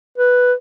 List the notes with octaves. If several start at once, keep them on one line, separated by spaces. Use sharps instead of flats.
B4